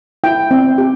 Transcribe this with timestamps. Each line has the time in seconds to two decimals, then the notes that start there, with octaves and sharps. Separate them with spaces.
0.24 E4 G5
0.51 C4
0.78 G4